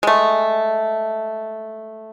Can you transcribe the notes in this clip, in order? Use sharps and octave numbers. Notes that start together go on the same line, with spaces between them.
G#3 A3